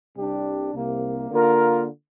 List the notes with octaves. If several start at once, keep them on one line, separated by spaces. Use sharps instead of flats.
C2 C3 G3 D4 G4
C2 C3 A#3
D3 A#3 F4 A#4